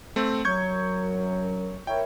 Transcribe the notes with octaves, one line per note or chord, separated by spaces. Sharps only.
A3 C4
F#2 F#3 C#6 G6 G#6
E4 A#4 C#5 G5